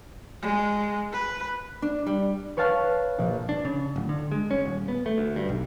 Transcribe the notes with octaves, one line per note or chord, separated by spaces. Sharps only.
G#3
B4
D4
G3
B4 C#5 F5 A5 F6 F#6
A#1
D4
C#3
D1
D3
G#3
C#4
D#1
B3
A3
D2
G2
B1